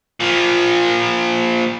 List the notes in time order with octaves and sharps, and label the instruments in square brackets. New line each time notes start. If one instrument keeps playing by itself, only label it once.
[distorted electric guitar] A#2 F3